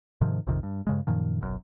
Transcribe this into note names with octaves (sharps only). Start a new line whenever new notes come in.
G#2 C3 D#3 F3
A#1 F2 C3 D#3
G2
G2 C#3 G#3
F#2 A#2 D#3 F3
F#1 B1 F#2